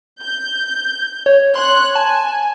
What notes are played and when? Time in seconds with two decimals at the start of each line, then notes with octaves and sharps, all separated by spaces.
0.22 G6
1.26 C#5
1.55 C#5 C6 F#6
1.95 G#5 A5